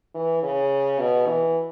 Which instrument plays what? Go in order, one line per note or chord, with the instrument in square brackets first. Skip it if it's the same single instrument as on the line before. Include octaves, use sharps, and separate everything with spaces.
[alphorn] E3
C#3
B2
E3